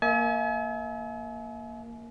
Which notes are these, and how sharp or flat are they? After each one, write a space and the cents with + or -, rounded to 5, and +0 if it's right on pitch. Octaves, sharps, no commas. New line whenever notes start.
A#3 +0 E5 -40 G#5 +40